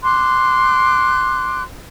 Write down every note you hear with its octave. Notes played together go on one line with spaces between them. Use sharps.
C6 D6 F#6